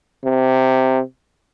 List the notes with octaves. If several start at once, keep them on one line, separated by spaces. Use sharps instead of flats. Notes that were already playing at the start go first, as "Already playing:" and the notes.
C3